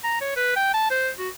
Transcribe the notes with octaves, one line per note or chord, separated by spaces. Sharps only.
A#5
C#5
B4
G5
A5
C5
F#4